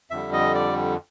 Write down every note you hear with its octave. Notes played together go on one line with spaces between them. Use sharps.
F2 D3 G3 E5
D#5
D5